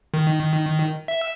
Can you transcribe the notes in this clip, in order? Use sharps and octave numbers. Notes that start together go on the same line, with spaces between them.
D#3
E5